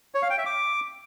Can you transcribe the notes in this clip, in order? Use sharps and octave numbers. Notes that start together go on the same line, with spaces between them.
C#5
F5
G5
E5
D6